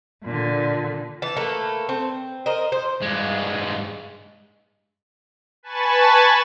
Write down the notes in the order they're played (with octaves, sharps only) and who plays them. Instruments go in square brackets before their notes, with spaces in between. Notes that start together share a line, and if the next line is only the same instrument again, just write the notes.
[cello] A#2 D3
[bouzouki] E3 A5
A3 A#3 B4
C4
A#4 C5 D#5
C5
[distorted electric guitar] G2 G#3
[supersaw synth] B4 G#5 A5 B5 C#6 A6